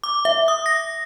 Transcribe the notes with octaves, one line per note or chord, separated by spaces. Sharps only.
D6
E5
D#6
A#6